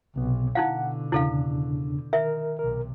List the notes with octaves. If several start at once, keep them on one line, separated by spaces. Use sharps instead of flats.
B1 C3 B3
B2 D3 D#4 E4 F5 F#5
E2 C#3 D4 E4 A4 F5
D#3 A#4 E5
B1 C3 A#4